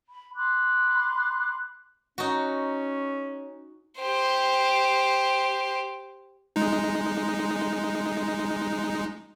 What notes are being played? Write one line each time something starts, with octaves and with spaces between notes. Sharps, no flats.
B5
B5 C6 D6 F#6
C#4 D#4 F#4
G4 C5
G#3 D#4